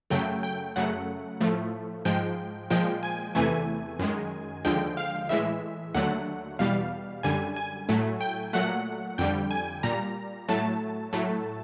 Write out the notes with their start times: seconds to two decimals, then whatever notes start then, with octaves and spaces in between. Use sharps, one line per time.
0.10 F#2 C#3 F#3 A3 G5
0.43 G5
0.76 F#2 C#3 F#3 A3 F#5
1.41 A2 F3 A3
2.05 G#2 F3 G#3 G5
2.70 A#2 F3 G#3 G5
3.03 G#5
3.35 E2 C3 E3 A3 G#5
3.99 F#2 D#3 G#3
4.65 D#2 D3 F3 G#3 G5
4.97 F5
5.29 A2 E3 G#3 E5
5.95 D#2 D3 F#3 A3 F#5
6.59 E2 B2 G3 F5
7.23 F#2 D3 G3 G#5
7.56 G#5
7.89 A2 F#3 A3
8.21 G5
8.53 A#2 F#3 A3 F#5
9.18 F2 D3 G3 G5
9.51 G#5
9.83 A#2 G3 A#5
10.49 A2 F#3 A3 A5
11.13 A2 F#3 A3